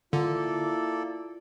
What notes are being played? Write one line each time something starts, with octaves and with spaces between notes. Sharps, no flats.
D3 A#3 E4 F4 A4 D5